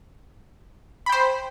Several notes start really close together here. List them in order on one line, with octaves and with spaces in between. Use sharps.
B5 G5 C5